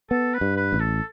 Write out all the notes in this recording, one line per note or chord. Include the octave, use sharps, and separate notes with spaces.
B3 A4
B4
G2
B4
A1
A4